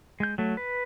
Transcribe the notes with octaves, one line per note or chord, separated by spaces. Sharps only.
G#3 G6
F#3 A3
B4